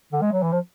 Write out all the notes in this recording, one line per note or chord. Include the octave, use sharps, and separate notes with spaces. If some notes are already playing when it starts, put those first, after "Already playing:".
D3
G#3
F#3
E3
F3